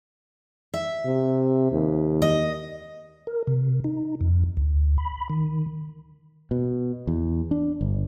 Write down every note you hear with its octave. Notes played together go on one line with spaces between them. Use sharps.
E5
C3
D#2
D#5
A#4
C3
D#4
F2
D2
B5
D#3
B2
E2
D4
G1